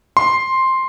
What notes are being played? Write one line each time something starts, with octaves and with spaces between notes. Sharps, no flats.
C6